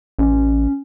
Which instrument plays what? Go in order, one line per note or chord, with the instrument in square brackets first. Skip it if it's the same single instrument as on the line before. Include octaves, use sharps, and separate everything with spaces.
[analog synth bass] A1 [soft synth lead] C#4